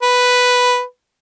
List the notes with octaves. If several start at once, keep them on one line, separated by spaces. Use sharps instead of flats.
B4